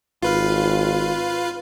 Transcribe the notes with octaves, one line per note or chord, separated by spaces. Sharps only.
G#1 F4 B4 F5